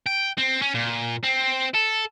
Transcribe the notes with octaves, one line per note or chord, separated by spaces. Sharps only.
G5
C4
C#4
A#2
C4
A4